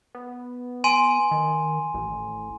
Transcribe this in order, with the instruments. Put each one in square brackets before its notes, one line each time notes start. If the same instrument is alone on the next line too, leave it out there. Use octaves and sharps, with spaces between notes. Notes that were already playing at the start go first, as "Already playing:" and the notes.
[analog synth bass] B3
[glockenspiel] G#5 C6 D#7
[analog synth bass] D#3
A1